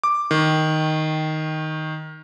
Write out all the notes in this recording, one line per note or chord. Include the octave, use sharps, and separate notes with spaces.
D6
D#3